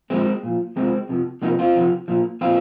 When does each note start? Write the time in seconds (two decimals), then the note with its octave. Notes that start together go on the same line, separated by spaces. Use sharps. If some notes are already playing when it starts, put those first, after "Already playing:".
0.10 A#2 F3 G#3 C4
0.43 A#2 F3
0.76 F2 C3 F3 G#3 C4
1.09 F2 C3 F3
1.42 F2 C3 F3 A#3 D#4
1.59 C4 F4
1.76 F2 C3 F3
2.08 A#2 F3
2.41 A#2 F3 C4 F4